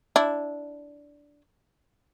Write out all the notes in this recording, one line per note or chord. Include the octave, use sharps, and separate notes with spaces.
D4 E4